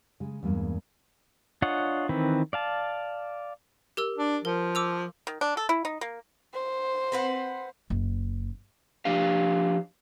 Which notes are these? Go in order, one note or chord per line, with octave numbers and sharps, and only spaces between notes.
C#3 G#3
E2 G2 G#3 A#3
D4 F4 C#5 D#5 F#5
D#3 E3 C4 B4
D5 F5 A5
G4 A#4 E6
D4
F3 A#4
D6 E6 F7
D#3
D4
A4
E4
D#4
A#3
C5
C4 B4 F#5
F#1
F3 D4 G4 F5